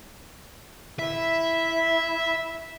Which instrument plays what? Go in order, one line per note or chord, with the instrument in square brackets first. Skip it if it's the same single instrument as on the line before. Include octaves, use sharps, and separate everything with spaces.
[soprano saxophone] E4 [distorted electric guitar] E5